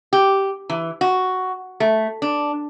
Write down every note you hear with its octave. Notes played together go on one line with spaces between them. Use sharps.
G4
E3
F#4
A3
D4